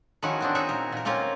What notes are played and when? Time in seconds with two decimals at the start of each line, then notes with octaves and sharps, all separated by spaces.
0.22 D#3 F3 C#4 E4 F#4 G#4
0.40 B3 C4 D4
0.55 D#4 F#4 G#4 E5
0.69 A#2 A#4
0.92 A#2 A#4
1.05 A#3 C4 C#4 F4 A#4